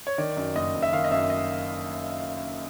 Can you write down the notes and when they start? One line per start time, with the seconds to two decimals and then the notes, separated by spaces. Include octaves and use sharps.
0.07 C#5
0.18 D#3 D5
0.37 F#2
0.55 F#1 D#5
0.74 F#1
0.82 E5
0.93 D#3 F5
1.04 D#5
1.11 F#2 E5
1.30 D#5